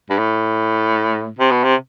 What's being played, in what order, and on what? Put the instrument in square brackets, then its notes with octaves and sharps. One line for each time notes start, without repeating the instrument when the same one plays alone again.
[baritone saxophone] G2
A2
C3
B2
C3